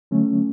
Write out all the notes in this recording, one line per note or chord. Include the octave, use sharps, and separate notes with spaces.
D3 F#3 A3 C#4